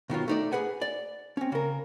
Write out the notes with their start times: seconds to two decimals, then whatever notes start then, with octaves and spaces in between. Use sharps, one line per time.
0.10 B2 D#3 F#3 F4
0.28 A3 D#4 D5
0.52 G#4 B4 F#5 G#5
0.81 D5
1.37 C4 C#4
1.52 C#3 A#4